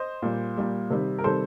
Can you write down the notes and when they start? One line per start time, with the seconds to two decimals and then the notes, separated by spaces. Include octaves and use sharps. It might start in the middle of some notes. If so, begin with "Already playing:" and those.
Already playing: C5 D#5
0.23 A#2 G3
0.58 A#2 G3
0.90 C3 D#3 G3
1.18 A#4
1.24 C3 D#3 G3 A4 C5